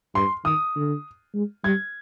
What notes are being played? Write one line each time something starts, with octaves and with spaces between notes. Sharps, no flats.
G2 C6
D#3 D#6
D3
G#3
G3 G#6